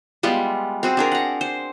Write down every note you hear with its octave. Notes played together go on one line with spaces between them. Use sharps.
G3 G#3 B3 F4
C4 F#4 G#4
D4 G#4 A#4
F#5 A#5
C5